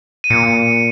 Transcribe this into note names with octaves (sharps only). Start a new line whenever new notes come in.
D#7
A#2 C#7